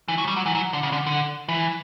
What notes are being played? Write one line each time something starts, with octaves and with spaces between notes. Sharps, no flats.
E3
F#3
G3
F#3
E3
F#3
D3
C#3
D3
D3
E3